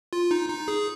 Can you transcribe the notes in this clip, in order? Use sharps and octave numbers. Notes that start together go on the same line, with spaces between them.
F4
D#4
D#4
G#4